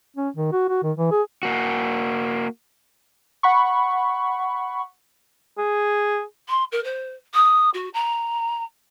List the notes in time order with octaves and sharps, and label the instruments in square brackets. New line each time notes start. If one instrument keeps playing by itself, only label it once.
[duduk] C#4
D#3
F#4
F#4
D#3
E3
G#4
[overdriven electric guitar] A#3 F#4
[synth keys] F#5 B5 C#6
[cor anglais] G#4
[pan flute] C6
A#4
C5
D#6
F#4
A#5